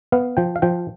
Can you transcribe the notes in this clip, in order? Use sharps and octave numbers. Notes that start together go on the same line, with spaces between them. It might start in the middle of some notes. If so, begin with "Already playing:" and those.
B3 F5
F3 G5
F5
F3 G5